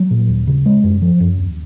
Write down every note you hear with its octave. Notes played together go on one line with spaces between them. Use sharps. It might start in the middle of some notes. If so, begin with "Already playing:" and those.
Already playing: F#3
A#2
D#2
C#3
G#3
F#2
F3
F#2
D#2